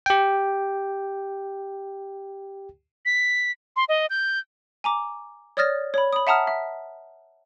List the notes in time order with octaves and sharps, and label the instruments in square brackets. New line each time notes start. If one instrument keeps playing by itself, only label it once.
[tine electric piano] G4 G5
[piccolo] B6
C6
D#5
G6
[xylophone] G#5 A#5 D6
C#5 D5 D#6 F6 A6 A#6
C#5 B5
B5 D#6
E5 F#5 A5 A#5 D#6 F6
E5